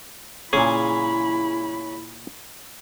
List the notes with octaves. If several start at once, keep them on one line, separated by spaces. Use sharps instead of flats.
A#2 C#3 C#4 E4 G#4 B5